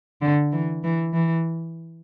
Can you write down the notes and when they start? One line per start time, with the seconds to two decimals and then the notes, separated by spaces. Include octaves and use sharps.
0.22 D3
0.52 E3
0.84 E3
1.14 E3